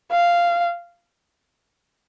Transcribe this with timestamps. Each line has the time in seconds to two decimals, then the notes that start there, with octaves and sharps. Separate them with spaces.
0.11 F5